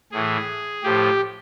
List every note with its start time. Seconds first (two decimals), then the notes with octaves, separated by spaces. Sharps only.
0.12 A2 E3 G#4
0.83 A2 F3 G4